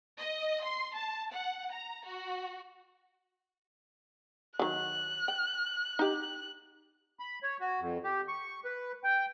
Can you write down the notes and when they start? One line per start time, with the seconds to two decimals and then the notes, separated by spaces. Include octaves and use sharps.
0.18 D#5
0.65 C6
0.96 A5
1.34 F#5
1.73 A#5
2.07 F#4
4.59 D#3 F#3 F#6
5.28 G5
5.99 D#4 G4
7.20 B5
7.43 C#5
7.60 F#4
7.80 F2
8.04 G4
8.28 C#6
8.65 B4
9.04 G5